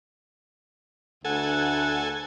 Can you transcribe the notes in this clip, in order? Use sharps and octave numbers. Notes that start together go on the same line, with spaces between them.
D2 A4 F#5 G#5